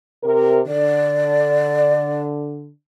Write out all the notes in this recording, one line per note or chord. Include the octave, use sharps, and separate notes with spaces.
C3 A#4
D3 D5